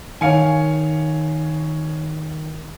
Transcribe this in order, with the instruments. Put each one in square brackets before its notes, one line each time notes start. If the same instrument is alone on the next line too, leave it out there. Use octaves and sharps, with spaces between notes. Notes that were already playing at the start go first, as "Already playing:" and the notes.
[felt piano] D#3 C#7 [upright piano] C#5 F5 G#5